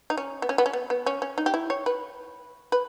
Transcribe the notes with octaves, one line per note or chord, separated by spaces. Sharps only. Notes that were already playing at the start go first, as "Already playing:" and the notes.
D#4
C#4
B3
C#4
B3
C#4
B3
B3
C#4
C#4
D#4
G4
E4
C#5
B4
B4